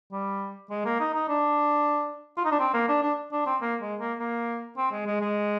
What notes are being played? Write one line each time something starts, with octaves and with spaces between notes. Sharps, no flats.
G3
G#3
A#3
D#4
D#4
D4
F4
D#4
D4
C4
A#3
D4
D4
D4
C4
A#3
G#3
A#3
A#3
C4
G#3
G#3
G#3